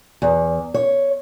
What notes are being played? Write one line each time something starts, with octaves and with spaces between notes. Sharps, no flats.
E2
C#5